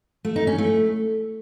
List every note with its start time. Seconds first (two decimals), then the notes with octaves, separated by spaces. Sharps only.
0.25 A3
0.36 D#4
0.47 C#4
0.58 A3